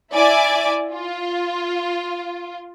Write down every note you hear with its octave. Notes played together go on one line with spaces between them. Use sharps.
E4 D5 E5 G#5 D6
F4